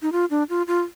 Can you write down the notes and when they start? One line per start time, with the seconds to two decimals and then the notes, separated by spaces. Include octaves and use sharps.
0.02 D#4
0.12 F4
0.30 D4
0.50 F4
0.68 F4